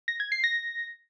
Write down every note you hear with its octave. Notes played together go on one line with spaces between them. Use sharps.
A#6
G#6
C7
A#6